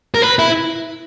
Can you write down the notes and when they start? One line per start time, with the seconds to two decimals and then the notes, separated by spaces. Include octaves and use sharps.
0.15 A#4
0.22 B4
0.39 E4